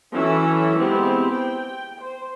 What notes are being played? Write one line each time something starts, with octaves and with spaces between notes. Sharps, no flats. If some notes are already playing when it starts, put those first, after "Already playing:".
E3 F#3 C#4 A4 E5
G#3 B3 C4 E4 G4
G5
C5